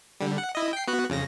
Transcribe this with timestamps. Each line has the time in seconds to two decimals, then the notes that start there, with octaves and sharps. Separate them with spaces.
0.20 D3 G3
0.38 F#5
0.55 E4 D#5
0.73 G5 C7
0.88 B3 F#4 F#6
1.10 F2 C#3 A#6